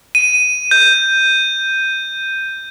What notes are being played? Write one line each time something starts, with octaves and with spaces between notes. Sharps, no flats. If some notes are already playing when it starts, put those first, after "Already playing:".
D#7
G6